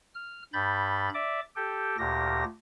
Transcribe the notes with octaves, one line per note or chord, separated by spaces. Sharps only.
F6
G2 B5 G6 A6
D5 E5 D6
G4 A4 G5
D2 A#2 G4 A#6